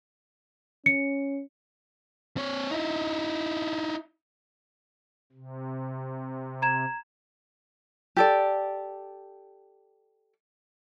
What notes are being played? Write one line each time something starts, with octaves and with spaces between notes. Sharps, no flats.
C#4 C#7
C4 C#5
D#4 E4
C3
A#5 G#6 E7
G4 A4 D5